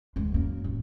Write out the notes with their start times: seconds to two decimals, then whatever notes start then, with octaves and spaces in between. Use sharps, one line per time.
0.16 D2 G#3
0.34 F#2 A#3
0.64 A1